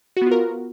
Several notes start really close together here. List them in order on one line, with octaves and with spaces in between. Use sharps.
F#4 B3 F4 A#4